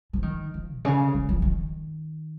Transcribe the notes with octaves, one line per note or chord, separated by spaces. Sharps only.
F3
D#3
F3
A#2
C#3
D#3
F3
D#3